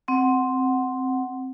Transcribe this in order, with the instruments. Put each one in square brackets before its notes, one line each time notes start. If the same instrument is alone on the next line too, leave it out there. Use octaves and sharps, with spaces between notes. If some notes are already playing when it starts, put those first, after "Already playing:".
[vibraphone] C4 F#5